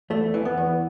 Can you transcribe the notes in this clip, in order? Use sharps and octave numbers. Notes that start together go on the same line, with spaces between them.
E2 A3
E3
B3
E2